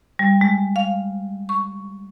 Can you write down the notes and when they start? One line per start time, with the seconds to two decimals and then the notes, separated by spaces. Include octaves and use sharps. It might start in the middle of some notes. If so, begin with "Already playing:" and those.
0.19 G3
0.41 G#3
0.76 F5
1.49 C#6